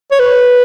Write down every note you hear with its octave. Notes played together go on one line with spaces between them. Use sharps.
C#5
B4